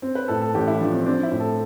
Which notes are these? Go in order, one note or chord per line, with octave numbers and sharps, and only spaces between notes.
C4
B4
A2 A4
A4
A1 G4
E4
F3 D4
C4
C4 D4
E4
A2
A4